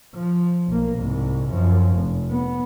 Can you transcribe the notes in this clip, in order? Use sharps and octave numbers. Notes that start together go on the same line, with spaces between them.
F3
B1 A#3
C2 G#2
F#2 F3
F1
B3